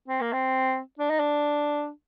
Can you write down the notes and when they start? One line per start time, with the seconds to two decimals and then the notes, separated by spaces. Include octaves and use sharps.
0.08 C4
0.21 A#3
0.33 C4
0.99 D4
1.10 D#4
1.19 D4